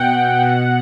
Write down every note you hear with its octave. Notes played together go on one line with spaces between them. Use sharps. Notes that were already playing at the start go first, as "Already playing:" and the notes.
Already playing: B2 F#5 G5
B2